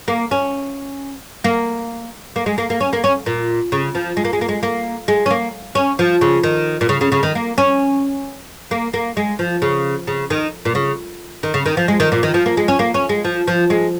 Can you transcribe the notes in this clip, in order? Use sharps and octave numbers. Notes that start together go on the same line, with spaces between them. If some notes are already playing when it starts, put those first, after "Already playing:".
A#3
C#4
A#3
A#3
G#3
A#3
A#3
C#4
A#3
C#4
A#2
C#3
F3
G#3
A#3
G#3
A#3
G#3
A#3
G#3
C#4
A#3
C#4
F3
C#3
D#3
A#2
C#3
C#3
C#3
D#3
A#3
C#4
A#3
A#3
G#3
F3
C#3
C#3
D#3
A#2
C#3
D#3
C#3
D#3
F3
G#3
D#3
A#2
D#3
F3
A#3
G#3
C#4
A#3
C#4
G#3
F3
F3
G#3